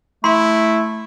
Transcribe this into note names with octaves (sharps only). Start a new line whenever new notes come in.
A3 E4 C6